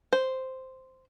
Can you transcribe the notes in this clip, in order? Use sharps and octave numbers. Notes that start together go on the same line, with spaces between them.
C5